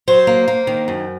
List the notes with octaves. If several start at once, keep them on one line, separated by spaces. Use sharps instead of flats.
F#3 C5
A#3
A#3
D#3
F#2